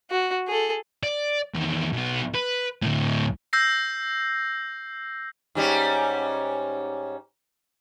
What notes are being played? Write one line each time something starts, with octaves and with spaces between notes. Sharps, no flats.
F#4
G#4 A4
D5
E2 D#3
B1 B3
B4
D2 A2
E6 G6 A#6 C7
G#2 G3 C#4